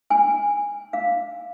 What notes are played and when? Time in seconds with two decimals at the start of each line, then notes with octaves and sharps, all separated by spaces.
0.10 G#5
0.93 F5